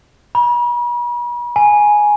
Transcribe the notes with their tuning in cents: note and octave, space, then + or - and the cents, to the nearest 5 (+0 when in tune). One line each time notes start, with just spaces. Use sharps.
B5 -45
G#5 +5